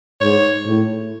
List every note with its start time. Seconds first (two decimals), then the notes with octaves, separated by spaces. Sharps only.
0.21 G#2 C#5
0.67 A2